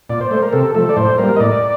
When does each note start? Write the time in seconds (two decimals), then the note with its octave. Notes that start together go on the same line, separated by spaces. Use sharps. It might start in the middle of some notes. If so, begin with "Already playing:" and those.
0.09 A#2 D5
0.21 C5
0.31 A3 C5
0.42 A#4
0.53 C3 A4
0.74 F3 A3 A4
0.89 D5
0.97 A2 C5
1.18 G3 A#3 A#4
1.36 D#5
1.40 A2 D5